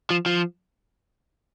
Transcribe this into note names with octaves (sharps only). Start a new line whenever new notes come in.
F3
F3